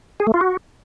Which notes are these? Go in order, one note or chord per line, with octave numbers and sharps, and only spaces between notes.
G#4
A3
F4
F#4